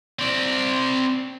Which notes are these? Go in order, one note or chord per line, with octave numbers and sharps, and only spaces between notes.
C4 D5